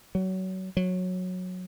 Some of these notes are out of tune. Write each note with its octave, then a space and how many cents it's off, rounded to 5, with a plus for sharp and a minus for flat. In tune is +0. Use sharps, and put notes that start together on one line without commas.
F#3 +25
F#3 -15